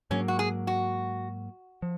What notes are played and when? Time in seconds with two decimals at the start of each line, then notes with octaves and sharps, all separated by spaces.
0.10 G#2 F#3 A#3 C#4
0.28 F#4
0.39 G#4
0.67 F#4
1.82 F3